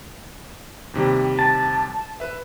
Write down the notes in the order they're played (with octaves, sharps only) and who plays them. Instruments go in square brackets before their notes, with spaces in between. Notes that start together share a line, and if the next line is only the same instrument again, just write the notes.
[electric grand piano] D#2 C3 G3
[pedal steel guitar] A5
[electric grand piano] B4 E5